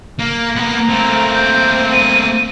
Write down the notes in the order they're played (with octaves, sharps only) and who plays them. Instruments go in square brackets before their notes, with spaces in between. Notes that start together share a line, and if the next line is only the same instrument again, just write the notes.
[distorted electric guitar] A#3
[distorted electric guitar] A#3 B3 [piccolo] A#5
[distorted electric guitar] A3 A#3 [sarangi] C4
[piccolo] G6
D#7